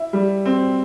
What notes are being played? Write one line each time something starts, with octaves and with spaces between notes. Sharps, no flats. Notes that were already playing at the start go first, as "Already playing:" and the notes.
Already playing: E4
G3
C4